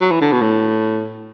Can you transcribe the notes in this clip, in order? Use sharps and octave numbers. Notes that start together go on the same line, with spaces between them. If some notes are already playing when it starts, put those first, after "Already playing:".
F#3
E3
D3
B2
A2